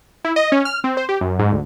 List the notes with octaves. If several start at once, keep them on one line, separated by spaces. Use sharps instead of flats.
E4
D#5
C#4
F6
C4
C5
G4
F#2
G#2
D2